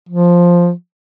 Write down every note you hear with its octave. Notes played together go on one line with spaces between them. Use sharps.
F3